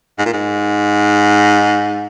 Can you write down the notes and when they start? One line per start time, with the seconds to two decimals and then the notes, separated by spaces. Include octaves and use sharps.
0.19 G#2
0.26 A#2
0.33 G#2